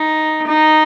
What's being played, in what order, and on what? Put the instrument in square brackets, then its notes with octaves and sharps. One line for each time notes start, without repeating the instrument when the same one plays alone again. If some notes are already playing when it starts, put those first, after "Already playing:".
Already playing: [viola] D#4
D#4